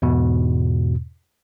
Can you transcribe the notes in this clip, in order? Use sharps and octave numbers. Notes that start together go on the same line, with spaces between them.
E2 G#2 B2